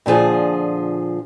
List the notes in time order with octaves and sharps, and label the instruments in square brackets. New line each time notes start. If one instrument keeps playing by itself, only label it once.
[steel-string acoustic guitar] A#2 D3 F3 G#4